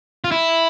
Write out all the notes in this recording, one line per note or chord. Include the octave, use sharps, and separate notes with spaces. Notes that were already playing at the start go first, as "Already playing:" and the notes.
F4
E4